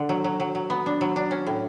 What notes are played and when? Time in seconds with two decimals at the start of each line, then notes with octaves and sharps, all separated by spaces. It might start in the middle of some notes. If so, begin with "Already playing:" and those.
Already playing: D3 D4
0.09 F#3
0.24 F#3
0.40 F#3
0.55 F#3
0.70 B3
0.86 D4
1.01 F#3
1.16 D4
1.31 C#4
1.47 A2